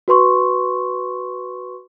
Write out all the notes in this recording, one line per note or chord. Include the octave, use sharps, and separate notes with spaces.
F#4 B4 C6 C#6